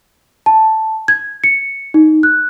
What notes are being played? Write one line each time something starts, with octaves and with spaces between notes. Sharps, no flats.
A5
G#6
C#7
D#4
F#6